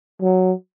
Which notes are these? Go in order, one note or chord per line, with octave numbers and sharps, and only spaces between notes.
F#3